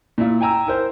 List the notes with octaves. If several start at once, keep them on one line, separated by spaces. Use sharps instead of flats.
A#2 E4 F4
G5 G#5 A#5 E6
E4 A#4 C5